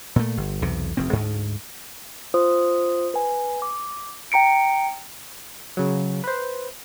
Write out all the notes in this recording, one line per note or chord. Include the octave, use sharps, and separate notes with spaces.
A#2 A3
G1
B1 E2 C3
F1 E2 C4
D2 G#2
F4 C5 D#6
B4 G#5
D6
G5 A#5 C#7 D7
C#3 F#3
B4 C5